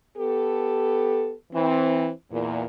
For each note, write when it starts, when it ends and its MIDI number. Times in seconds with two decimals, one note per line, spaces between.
0.17 1.34 59
0.17 1.34 67
0.17 1.34 69
1.53 2.09 52
1.53 2.09 60
2.31 2.64 40
2.31 2.64 46